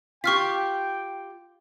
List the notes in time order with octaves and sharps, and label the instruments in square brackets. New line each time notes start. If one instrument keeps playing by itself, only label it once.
[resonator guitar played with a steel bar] F4 G4 [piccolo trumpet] G5 [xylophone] C#6 F6 B6